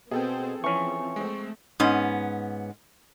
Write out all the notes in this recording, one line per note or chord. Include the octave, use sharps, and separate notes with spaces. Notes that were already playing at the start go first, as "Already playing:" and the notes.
B2 B3 C4 G#4 A4 C5 G5
E3 F3 C4 C#4 C#6
G#3 A3 C4
G#2 B3 C#4